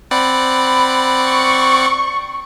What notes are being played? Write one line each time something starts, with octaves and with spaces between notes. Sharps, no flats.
C4 D5 F#5 B5
C#6